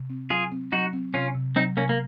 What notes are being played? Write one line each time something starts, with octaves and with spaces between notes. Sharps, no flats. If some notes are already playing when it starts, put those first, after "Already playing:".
Already playing: C3
C4
F#3 F4 G#4
C4
F#3 D#4 F#4
C4
C3 C#4 F4
C3
F#3 C4 D#4
C3 A#3 C#4
A#3